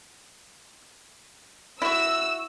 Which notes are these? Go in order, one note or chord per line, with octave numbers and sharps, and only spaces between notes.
E4 F#4 E6